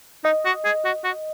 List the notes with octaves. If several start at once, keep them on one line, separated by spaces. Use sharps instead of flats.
D#4 D#5
F#4
G#4
F#4
F#4